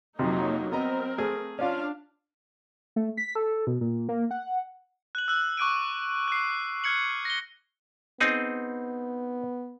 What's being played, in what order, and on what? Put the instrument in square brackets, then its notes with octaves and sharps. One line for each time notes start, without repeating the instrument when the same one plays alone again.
[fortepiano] F2 C3 [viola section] F#3 A#3 D#4
[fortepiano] B3 D#5 A#5 [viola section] C4 A#4
[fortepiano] A3 G#4
[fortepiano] C#4 F4 [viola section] D4 F5
[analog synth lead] A3
B6
A4
B2
A#2
A#3
F#5
[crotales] F#6 F#7
E6 F#6
C#6 D6 F#6 D7 D#7
F#6 C7
F6 F#6 G#6 C#7 F#7
A#6 G7
[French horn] B3 [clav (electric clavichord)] C4 D#4 G#4